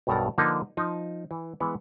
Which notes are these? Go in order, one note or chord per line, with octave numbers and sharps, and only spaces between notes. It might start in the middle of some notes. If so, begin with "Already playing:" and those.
B1 G2 B2 A4 A#4 A#5
D3 F3 A#3 D4 D#4 B4
F3 D#4
E3
E3 G#3 B3